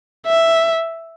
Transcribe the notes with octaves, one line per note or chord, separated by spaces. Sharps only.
E5